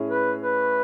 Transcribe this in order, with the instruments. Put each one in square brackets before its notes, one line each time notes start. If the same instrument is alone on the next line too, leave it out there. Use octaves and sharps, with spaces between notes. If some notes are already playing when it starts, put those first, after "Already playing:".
Already playing: [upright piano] A2 C#4 G#4
[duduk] B4
B4